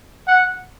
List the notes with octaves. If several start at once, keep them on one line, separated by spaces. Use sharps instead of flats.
F#5